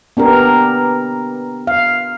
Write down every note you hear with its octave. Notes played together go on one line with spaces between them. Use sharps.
B3 D4 G4 A#4
F5